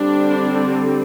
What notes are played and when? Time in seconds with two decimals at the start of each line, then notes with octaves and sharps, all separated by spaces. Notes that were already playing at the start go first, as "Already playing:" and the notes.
Already playing: D3 G3 C4 D4